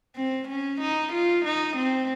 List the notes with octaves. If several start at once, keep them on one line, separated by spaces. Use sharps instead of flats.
C4
C#4
D#4
F4
D#4
C4